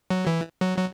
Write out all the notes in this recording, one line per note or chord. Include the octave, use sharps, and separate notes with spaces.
F#3
E3
F#3
F#3